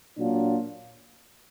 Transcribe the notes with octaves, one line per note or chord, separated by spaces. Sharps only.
A#2 F#3 D4 F4